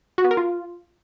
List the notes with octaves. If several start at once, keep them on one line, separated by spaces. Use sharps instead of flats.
F#4
B3
A#4
F4